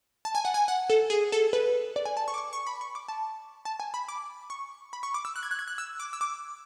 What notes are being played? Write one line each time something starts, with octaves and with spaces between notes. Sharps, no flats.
A5
G#5
F#5
G#5
F#5
A4
G#4
A4
B4
D5
G#5
A5
C#6
D6
C#6
C#6
B5
C#6
D6
A5
A5
G#5
B5
D6
C#6
B5
C#6
D6
E6
F#6
G#6
F#6
G#6
F#6
E6
D6
E6
D6